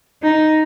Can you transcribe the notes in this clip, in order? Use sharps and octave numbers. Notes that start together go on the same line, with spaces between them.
D#4